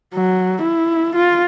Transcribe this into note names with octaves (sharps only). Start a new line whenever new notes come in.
F#3
E4
F4